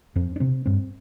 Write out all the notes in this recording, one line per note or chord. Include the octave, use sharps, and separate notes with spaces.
F2 C4
D4
C3 C4
G2 C4